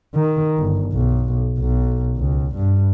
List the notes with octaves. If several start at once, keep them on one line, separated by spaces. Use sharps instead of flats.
D#3
G1
B1
B1
C#2
G2